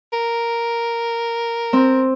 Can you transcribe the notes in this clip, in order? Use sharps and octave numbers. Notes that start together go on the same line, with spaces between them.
A#4
C4